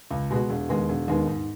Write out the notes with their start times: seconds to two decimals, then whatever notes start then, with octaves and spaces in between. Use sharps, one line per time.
0.11 C#2
0.30 B2 G#3 B3 F#4
0.50 E1
0.69 D#2 D#3 G#3 B3
0.89 E1
1.08 D#2 D#3 G#3 B3
1.27 G#2